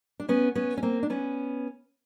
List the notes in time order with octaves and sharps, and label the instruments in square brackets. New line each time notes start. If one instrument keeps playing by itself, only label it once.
[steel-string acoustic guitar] D4
B3 C#4
B3 C#4
C#4
A#3 C4
D4
B3 C#4